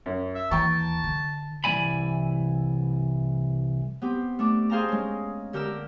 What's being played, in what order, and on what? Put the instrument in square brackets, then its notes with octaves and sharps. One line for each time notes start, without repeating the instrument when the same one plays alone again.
[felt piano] F#2
[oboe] E5
[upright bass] D#2 E3 [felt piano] G5 A#5 C#6 [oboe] A5
[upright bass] D3
[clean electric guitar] C2 E3 A3 D5 G#5 B5
[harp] B3 C4 G4
A3 D4 D6
G#4 C5 F5 G5 A5 A#5
G#3 C#4
D3 G4 A#4 A#5 E6